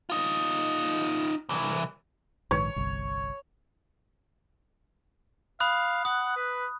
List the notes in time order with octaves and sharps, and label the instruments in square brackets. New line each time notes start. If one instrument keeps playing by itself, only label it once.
[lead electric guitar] D#4 F4
C2 E3
[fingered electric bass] A#1 G#2 D#3 [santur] C#5
[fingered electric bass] G1 C2
[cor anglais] F5 [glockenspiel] B5 D#6 F#6
[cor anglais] F#5 [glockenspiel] D#6
[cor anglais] B4